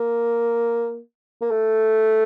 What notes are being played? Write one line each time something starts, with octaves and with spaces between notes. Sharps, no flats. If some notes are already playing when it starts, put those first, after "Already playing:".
Already playing: A#3
A#3
A3